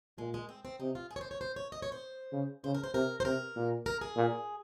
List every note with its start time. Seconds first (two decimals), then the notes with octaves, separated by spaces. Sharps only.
0.18 A#2 G#3
0.34 G#3
0.49 C4
0.65 C4
0.80 C3 D#4
0.95 F4
1.11 G#4
1.16 C#5
1.21 C5
1.31 C#5
1.41 C5
1.56 C#5
1.72 D#5
1.82 C#5
1.92 C5
2.32 C#3
2.64 C#3 C5
2.74 A#4
2.84 C5
2.94 C3 A#4
3.20 C5
3.25 C3 A#4
3.56 A#2
3.86 A#4
4.01 G#4
4.16 A#2